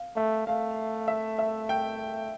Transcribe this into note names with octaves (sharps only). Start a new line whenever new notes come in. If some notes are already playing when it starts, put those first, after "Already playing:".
Already playing: F5
A3 E5
A3 F5
E5
E5
G5